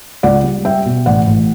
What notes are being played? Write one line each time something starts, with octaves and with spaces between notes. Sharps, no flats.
C#2 D5 F#5
G3
G3 E5 G5
B2
A1 D5 F#5
A1